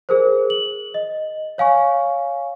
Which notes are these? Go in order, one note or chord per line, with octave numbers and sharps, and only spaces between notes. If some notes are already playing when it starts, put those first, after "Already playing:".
G#4 A#4 C5
F#7
D#5
C#5 F5 G#5 C#6